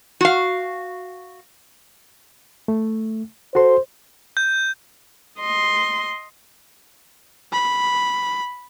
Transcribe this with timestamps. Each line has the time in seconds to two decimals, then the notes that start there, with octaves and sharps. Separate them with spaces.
0.21 F#4 F5
2.68 A3
3.55 F#4 A4 C5 C6
4.37 G6
5.40 D#5 C6
7.52 B5